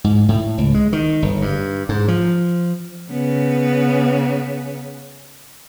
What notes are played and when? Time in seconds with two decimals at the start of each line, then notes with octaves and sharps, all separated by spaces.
0.04 G#2
0.29 A2
0.58 C#2
0.74 G#3
0.93 D#3
1.22 G1
1.42 G2
1.89 G#2
2.08 F3
3.11 C#3 B3